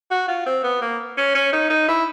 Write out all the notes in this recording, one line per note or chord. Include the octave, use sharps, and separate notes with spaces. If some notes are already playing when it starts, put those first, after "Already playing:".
F#4
F4
C4
B3
A#3
C#4
C#4
D#4
D#4
E4